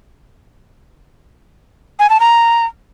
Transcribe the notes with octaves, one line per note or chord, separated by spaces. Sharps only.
G#5
A5
A#5